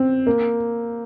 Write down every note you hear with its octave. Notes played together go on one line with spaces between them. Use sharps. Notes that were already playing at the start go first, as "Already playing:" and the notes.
Already playing: C4
A#3